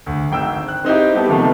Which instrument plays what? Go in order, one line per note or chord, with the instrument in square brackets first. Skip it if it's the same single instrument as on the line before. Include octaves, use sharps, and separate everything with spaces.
[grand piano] D2
G#1 G5 E6
F#6
C4 D#4 E4 G4
G3 B3 G4 A4
C3 D#3 F3 A3 B3